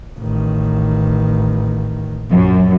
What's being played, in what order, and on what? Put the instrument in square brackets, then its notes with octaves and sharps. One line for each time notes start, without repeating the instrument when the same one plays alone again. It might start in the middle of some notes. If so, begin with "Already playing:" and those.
[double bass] A1 D#3
[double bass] A#1 [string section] F#2